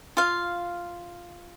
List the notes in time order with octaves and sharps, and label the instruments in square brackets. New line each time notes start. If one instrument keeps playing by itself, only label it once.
[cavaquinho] F4 F5